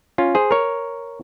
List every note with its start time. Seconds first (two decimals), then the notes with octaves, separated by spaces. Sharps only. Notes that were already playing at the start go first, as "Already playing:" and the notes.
0.18 C#4 F4
0.35 G#4 C5
0.51 A#4 C#5